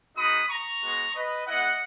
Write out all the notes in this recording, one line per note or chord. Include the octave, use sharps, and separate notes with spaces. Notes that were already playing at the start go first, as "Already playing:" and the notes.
G#3 D#4 F#4 B5 D#6
A#5 C#6
G#3 B3 F#4
B4 D#5
G#3 B3 E4 D#5 F#5